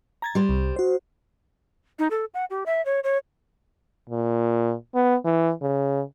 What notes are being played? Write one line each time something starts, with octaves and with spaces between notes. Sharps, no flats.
A#5 G#6 A6
G3 C5
C2
F#4 C5
D#4
A4
F#5
G4
E5
C#5
C#5
A#2
B3
E3
C#3